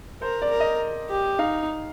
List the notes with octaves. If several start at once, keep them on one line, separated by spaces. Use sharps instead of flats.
A#4 C5
D5
A#4
D#5
G4
D#4 F5